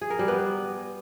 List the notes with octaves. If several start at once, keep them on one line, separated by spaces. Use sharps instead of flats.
G#4
A#4
G3
B3